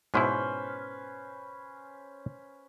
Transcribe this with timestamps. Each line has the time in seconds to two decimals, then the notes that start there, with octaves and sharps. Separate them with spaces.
0.14 G#2 B2 C#4 E4 B4 C5